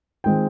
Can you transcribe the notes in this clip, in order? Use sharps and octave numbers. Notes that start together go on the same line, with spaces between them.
D#3 G#3 C4 F4 G5